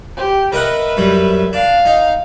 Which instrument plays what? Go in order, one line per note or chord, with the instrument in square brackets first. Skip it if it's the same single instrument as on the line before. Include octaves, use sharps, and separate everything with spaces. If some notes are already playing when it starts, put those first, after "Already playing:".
[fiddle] G4
[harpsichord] A#4 D#5 F#5 [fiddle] B4 E5
[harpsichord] F#2 G3
[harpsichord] D4 [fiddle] F5
[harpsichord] D#4